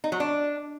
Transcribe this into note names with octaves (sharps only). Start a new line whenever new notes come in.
D#4
F#3
D4